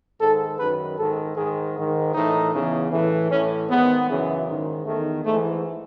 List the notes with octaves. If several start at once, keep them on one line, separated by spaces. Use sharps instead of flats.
G#2 D#3 A4
F#2 D#3 B4
G#2 D#3 A4
G#2 D#3 G#4
G#2 D#3
A2 E3 D#4
E2 C#3 E3
A2 E3
A2 E3 C#4
G#2 D#3 B3
F#2 C#3 E3
G#2 D#3
E2 D#3 A3
G#2 E3 A3